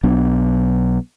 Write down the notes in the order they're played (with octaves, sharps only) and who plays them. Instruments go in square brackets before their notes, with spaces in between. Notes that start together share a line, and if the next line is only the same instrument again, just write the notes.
[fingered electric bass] B1 F#3 B3 D4